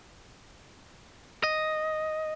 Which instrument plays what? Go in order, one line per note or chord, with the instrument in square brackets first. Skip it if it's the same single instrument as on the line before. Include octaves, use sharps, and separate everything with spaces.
[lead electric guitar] D#5